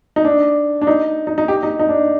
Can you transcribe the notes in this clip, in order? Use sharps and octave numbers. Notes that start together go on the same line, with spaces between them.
D#4
D4
D4
D#4
D#4
D#4
G4
D#4
D#4
D4